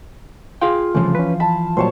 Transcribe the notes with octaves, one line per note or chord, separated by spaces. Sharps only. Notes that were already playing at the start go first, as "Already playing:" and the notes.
F4 G#4 F5 G5
C2 C#3 E3 F3 A3
C#4 B4
A5 B5
A#2 F#3 G3 C5 C#5 A5